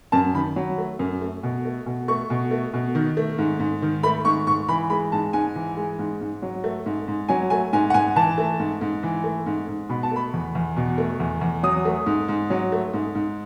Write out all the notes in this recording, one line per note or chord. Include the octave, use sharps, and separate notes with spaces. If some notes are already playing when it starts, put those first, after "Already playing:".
F#2 A5
D#3 B5
F#3
A3
F#2
A3
B2
A3
B2
A3 C#6
B2
A3
B2
D#3
A3
G#2
G#2
D#3
A3 B5
G#2 C#6
G#2 C#6
E3 B5
G#3 B5
G#2 A5
G#2 G#5
E3
G#3
G#2
G#2
F#3
A3
G#2
G#2
F#3 G#5
A3 G#5
G#2 G#5
F#5
G#2 G#5
E3 A5
A3
G#2
G#2
E3
A3
G#2
G#2
B2 B5
A5
A3 B5
E2
E2
B2
A3
E2
E2
F#3 D#6
A3
G#2
G#2
F#3
A3
G#2
G#2